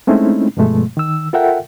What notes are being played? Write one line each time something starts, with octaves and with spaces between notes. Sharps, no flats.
G#3 A3 C4 C#4 D#4 E4
G2 B2 F3 G#3 A3
D#3 E6
F4 A4 A#4 E5 F#5 G5